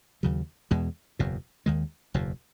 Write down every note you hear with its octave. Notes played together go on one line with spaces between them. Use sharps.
D#2 C#3 F#3
E2 B2 G#3
F#1 E2 B2
D#2 D#3 G#3
F#1 E2 B2